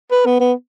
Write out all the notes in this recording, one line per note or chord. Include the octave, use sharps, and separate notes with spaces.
B4
B3
B3